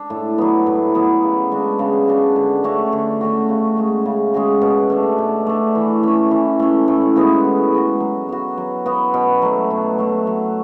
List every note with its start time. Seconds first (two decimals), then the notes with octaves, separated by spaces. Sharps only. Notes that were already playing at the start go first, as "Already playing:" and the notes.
Already playing: D4
0.10 A2
0.38 F#3 B3
0.67 A2
0.95 F#3 B3
1.23 C#3
1.51 G#3 D4 F#4
1.79 C#3
2.08 G#3 D4 F#4
2.36 D3
2.64 A3 C#4 F#4
2.93 D3
3.21 A3 C#4 F#4
3.49 C#3
3.77 G#3 C#4 F#4
4.06 C#3
4.34 G#3 C#4 F#4
4.62 B2
4.90 A3 D4
5.18 B2
5.47 A3 D4
5.75 E3
6.03 A3 C#4
6.31 E3
6.60 A3 C#4
6.88 A2
7.16 G#3 B3 F#4
7.45 A2
7.72 G#3 B3 F#4
8.00 F#3
8.29 B3 F#4
8.58 F#3
8.86 B3 F#4
9.14 B2
9.42 F#3 A3
9.71 B2
9.98 F#3 A3
10.27 F#3